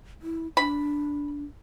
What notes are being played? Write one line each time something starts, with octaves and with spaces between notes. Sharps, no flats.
E4
D4 B5